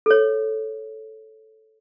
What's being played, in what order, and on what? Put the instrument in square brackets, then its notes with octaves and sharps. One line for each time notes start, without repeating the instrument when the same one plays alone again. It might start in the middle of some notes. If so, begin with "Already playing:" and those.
[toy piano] A4 C#5